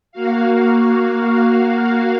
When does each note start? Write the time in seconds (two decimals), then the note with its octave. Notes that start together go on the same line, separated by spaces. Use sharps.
0.12 A#3 F#4 F5